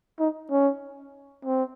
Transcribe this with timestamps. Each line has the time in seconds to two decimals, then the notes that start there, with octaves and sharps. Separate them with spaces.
0.20 D#4
0.51 C#4
1.45 C4